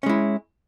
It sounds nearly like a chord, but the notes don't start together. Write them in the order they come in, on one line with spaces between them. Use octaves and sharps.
C#4 G#3 E4